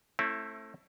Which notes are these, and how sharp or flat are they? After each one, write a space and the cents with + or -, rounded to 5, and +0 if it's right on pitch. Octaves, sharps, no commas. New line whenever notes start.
A3 +10 C4 +45 E4 +0